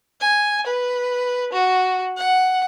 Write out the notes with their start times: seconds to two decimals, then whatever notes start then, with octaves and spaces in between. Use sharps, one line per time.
0.21 G#5
0.66 B4
1.53 F#4
2.17 F#5